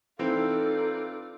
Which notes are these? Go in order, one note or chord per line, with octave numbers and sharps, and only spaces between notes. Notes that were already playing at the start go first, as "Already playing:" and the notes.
E3 C4 D#4 F4 A4 D5